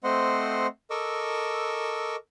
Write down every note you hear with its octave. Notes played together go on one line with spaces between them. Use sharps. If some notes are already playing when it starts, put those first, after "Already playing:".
A3 C4 C5 D#5 F#5 C6
A4 A#4 D#5 C#6 D6 E6